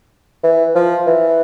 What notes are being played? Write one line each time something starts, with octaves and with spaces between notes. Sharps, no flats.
E3
F3
E3